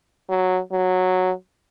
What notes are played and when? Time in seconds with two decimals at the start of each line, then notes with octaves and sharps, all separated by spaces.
0.29 F#3
0.72 F#3